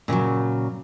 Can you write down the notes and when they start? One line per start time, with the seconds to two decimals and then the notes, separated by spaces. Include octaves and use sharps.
0.08 A#2 C#3 E3 F#3